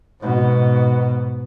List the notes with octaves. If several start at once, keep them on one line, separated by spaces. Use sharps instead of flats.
G#2 B2